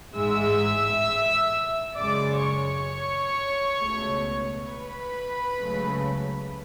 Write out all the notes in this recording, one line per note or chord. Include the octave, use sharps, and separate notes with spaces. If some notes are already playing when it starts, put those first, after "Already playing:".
A1 G#2 G#3 E5 E6
F#2 C#3 G#3 D5 D6
C#5 C#6
C#2 B2 A3
B4 B5
C#2 C#3 F#3 A3